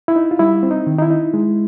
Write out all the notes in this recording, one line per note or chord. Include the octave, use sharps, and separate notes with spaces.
E4
D#4
F4
G3 E4
C4
D#4
D#3
D#4
E4
D#4
G#3